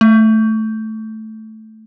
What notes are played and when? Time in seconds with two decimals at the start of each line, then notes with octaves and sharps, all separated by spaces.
0.01 A3